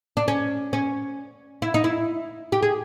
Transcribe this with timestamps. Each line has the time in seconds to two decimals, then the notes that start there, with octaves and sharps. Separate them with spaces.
0.17 D4
0.28 C#4
0.73 C#4
1.62 E4
1.74 D#4
1.84 E4
2.52 G4
2.63 G#4